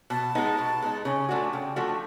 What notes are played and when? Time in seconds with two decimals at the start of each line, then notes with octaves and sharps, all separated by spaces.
0.10 B2 A5
0.35 G#3 B3 D#4
0.58 B2
0.82 G#3 B3 D#4
1.05 C#3 G#5
1.29 F3 A3 D4 F#4
1.53 C#3 G5
1.76 F3 A3 D4 F#4